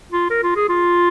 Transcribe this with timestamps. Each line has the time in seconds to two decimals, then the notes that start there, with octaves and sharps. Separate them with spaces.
0.12 F4
0.30 A#4
0.43 F4
0.56 G#4
0.69 F4